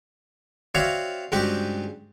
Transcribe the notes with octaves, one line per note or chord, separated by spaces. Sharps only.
C4 F#4 C#5 D5 E5 F5
C#2 G2 C4 F#4 G4 G5